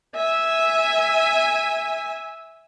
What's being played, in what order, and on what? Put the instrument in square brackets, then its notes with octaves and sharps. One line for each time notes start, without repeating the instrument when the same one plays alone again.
[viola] E5 G#5